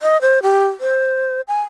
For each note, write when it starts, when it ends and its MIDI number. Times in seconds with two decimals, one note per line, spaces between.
0.02 0.20 75
0.21 0.39 72
0.43 0.67 67
0.80 1.41 72
1.48 1.61 80